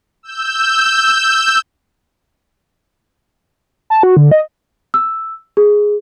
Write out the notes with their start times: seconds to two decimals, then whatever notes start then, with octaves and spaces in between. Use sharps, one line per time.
0.23 E6 G6
3.90 A5
4.03 F#4
4.17 D3
4.31 D#5
4.94 E6
5.57 G#4